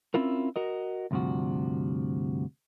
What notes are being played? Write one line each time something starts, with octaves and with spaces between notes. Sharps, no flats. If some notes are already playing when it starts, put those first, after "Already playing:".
C4 C#4 E4 F4 A#4
F#4 A#4 D#5
D2 G2 C3 F3 F#4